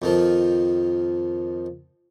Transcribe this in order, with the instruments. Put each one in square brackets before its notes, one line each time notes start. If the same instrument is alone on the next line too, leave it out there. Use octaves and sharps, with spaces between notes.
[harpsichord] F2 D#3 F3